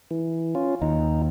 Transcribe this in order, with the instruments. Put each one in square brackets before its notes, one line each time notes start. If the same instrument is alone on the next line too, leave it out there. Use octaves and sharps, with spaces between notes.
[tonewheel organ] E3
C#4 F4
[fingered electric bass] D#2 [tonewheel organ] D#4